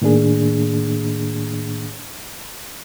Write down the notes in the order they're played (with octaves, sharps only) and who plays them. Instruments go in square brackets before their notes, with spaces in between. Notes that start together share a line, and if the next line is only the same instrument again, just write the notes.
[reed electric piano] A2 D#3 A#3 D4 G#4